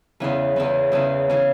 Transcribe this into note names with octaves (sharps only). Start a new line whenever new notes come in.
E2 C#3 E3
E2 C#3 E3
E2 C#3 E3
C#3 E3